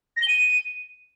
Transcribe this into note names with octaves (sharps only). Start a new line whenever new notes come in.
A#6
G7
D#7